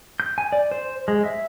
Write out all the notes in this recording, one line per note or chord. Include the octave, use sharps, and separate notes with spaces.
G6
G#5
D5
C5
G#3
E5